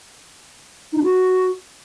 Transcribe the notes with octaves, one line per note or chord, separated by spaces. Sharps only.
D#4
D4
F#4